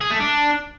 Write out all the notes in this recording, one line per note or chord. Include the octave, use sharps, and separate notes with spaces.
G#4
A3
D4